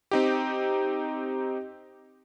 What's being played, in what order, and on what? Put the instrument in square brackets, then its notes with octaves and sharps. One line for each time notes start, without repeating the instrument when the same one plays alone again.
[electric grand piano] C4 D#4 G4